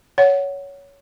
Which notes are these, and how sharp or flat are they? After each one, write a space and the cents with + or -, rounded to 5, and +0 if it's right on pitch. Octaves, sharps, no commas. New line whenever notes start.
C#5 +15 F#5 +0